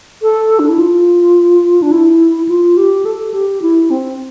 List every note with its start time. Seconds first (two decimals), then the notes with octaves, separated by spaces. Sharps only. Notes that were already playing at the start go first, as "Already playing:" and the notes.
0.22 A4
0.59 D4
0.69 E4
0.79 F4
1.82 D4
1.92 E4
2.48 F4
2.77 G4
3.05 A4
3.34 G4
3.62 E4
3.90 C4